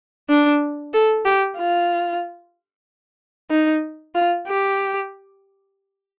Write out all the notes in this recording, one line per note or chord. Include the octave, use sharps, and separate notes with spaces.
D4
A4
G4
F4
D#4
F4
G4